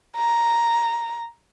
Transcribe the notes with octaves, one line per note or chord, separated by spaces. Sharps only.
A#5